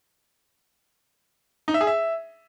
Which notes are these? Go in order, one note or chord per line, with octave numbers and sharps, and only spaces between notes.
D#4
E5
G#4
E5